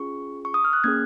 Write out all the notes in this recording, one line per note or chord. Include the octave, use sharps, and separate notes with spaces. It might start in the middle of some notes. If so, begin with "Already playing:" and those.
Already playing: C#4 F4 G#4 C#6
C#6
D#6
F6
F#6
A#3 C#4 G#4 G#6